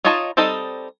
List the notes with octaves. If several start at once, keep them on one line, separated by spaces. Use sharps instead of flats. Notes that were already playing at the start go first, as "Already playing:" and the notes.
D#4 F4 C#5 D#5 A5
G3 C4 D#4 A4 D#5